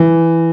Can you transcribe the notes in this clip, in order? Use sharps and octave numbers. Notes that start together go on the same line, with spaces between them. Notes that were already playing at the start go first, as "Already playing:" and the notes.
Already playing: E3